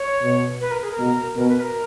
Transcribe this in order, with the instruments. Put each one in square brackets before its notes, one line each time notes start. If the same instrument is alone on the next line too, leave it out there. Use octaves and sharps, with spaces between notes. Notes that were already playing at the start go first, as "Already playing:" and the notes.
Already playing: [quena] C#5
[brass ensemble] B2
[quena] B4
A#4
G#4
A#4
[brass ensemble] B2
[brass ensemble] B2 [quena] A#4
[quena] B4
A#4